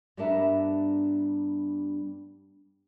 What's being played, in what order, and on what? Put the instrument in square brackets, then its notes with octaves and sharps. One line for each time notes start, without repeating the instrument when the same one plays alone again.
[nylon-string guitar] G2 G3 B3 D4 A#4 E5